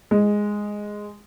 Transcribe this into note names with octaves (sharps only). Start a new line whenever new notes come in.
G#3